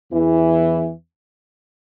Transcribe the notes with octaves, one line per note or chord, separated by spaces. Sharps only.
E2 E3